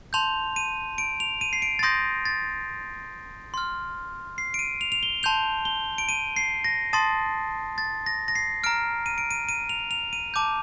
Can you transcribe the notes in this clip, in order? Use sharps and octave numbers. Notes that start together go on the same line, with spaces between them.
A5 C6 G6 F7
D#7
D7
F7
D#7
C7
D7
A6
C6 D#6 G6 A#6
A6
C6 F6
C7
D7
D#7
F7
F7
G7
A5 C6 G6 F7
G7
D7
D#7
C7
A#6
A5 C6 D#6 A6
A6
A#6
A#6
C7
A#5 F6 D7
D#7
D7
D#7
D#7
F7
F7
D#7
A5 D6 G6